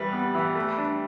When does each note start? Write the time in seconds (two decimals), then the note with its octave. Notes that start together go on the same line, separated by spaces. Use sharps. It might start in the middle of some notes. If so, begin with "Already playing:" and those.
Already playing: E3 G3 E4 B4
0.13 B3
0.35 E3
0.55 A3
0.78 D4